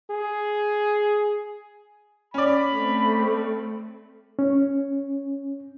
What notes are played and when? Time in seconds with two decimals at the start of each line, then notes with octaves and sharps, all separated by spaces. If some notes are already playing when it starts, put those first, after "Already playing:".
0.11 G#4
2.34 C#4 D5 B5
2.75 A3 C4
4.39 C#4